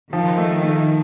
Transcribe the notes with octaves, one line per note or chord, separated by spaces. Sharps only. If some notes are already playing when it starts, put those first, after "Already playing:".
D#3 F3
A3
A3